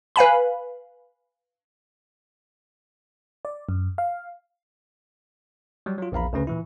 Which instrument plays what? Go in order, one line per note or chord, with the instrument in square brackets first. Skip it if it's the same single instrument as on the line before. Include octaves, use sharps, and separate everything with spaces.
[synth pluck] B4 F5 G#5 B5
[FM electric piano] D5
F#2
F5
[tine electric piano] F#3 G3
F#3 F4
A#1 E2 F5 A#5 B5
D2 C#3 C#4 B4
A#2 E3 E4